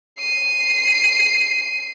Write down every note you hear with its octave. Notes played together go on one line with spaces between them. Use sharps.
C7 D#7